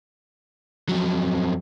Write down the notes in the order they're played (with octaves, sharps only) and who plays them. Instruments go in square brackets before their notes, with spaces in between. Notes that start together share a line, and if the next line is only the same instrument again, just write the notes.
[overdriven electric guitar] F2 F#3